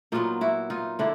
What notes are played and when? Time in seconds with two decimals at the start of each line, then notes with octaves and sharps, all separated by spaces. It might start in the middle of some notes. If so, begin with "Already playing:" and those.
0.12 A#2 F#3 B3 D#4 F4
0.41 E4 F#4
0.70 D#4 F4
0.99 D3 D4 E4